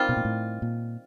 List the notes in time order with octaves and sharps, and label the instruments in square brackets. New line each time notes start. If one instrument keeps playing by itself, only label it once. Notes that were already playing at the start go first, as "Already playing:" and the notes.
Already playing: [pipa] D#3 G3 C4 F4
[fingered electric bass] B2
A#2
A2
A#2